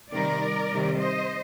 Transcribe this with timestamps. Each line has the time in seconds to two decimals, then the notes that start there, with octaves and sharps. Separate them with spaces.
0.12 C3 D#3 G3 A#4 D5
0.70 C3 D#3 G3
0.98 C5 D#5